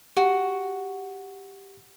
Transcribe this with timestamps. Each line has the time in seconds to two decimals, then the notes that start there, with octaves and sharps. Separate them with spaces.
0.17 F#4 G4